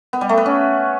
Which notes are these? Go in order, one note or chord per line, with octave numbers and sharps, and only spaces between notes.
B3
G3
A3
B4
C#4